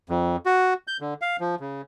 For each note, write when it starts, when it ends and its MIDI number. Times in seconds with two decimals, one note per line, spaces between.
0.10 0.36 41
0.46 0.74 66
0.88 0.97 91
1.01 1.14 50
1.22 1.37 77
1.40 1.55 53
1.60 1.81 49